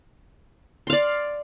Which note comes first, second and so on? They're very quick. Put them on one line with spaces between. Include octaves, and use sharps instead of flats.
C6 F5 D5